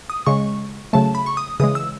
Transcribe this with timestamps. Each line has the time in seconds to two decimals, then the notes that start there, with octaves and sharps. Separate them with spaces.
0.10 D#6
0.27 C#3 G#3 C#6
0.93 C#3 F#3 A3 A5
1.15 B5
1.26 C#6
1.37 D#6
1.60 C#3 E3 G#3 D#6
1.75 E6